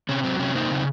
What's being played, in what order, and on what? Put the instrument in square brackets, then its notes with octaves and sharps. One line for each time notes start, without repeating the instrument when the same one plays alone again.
[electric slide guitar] C3 C#4
F#3 C4
C3 C#4
A#3 C4 D#4
C#3